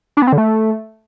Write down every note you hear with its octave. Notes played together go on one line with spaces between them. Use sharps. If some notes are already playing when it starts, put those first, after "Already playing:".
D4
B3
C4
D3
A3